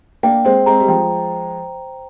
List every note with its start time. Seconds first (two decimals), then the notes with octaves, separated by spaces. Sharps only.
0.23 A#3 D4 G5
0.45 G#3 C4 C5
0.66 G#3 C4 A#5
0.80 G3
0.88 F3 G#3 G5